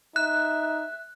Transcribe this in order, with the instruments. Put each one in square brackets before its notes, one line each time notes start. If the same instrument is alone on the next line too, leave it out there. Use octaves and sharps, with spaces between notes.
[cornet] D#4 [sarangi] E5 [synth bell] F#6